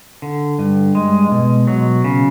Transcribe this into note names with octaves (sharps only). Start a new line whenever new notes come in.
D3
G2
G#3
B2
F#3
C#3